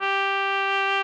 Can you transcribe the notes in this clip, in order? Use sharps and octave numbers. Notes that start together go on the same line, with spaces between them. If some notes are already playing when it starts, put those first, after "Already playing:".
G4